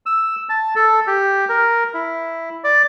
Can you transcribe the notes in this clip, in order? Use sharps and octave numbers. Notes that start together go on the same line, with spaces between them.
E6
A5
A4
G4
A#4
E4
D5